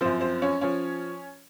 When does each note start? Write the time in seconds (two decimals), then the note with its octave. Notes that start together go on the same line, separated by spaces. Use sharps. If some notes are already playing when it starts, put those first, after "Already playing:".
0.01 F#2 F3 C4 C5
0.21 C4 C5
0.42 C#4 C#5
0.61 F3 C#4 C#5